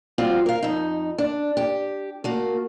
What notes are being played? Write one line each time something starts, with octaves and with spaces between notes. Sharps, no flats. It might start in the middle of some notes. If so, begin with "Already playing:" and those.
G3 C4 F4 F#4
A#4 F5
F2 D#4
D4
G4
A3 A#3 F#4